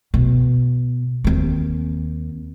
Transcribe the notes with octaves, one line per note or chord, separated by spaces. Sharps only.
B2
D#2 C4